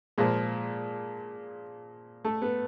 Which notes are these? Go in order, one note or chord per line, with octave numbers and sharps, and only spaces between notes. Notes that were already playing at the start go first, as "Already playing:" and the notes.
A#2 F3 G#3
A3
B3